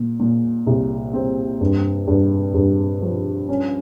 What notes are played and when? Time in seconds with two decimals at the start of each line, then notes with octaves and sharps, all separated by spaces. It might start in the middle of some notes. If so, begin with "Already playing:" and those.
Already playing: A#2
0.20 A#2
0.67 C2
1.14 C4
1.61 G2
2.07 G2
2.54 G2
3.02 F3
3.49 C#4